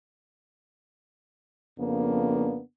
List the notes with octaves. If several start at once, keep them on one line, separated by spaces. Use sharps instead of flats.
F2 C#3 A#3 B3 D4